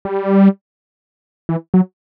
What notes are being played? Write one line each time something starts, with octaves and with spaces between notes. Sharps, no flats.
G3
E3
F#3